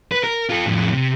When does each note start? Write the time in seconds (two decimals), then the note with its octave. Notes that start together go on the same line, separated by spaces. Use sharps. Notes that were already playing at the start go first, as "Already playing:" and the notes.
0.12 B4
0.24 A#4
0.50 F4 A4
0.66 F2 A2
0.92 C3